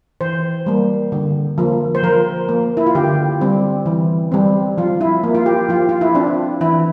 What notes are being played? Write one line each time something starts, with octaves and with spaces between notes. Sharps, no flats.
E3 C5
G3 A#3
D3
F3 A#3
C5
F3 A#4
A#3
E4
F4
D3 G4
G3 C4
E3
G3 C4
F3 F4
E4
A#3
F4
G4
F3 F4
F4
E4
C4 D4
E3 E4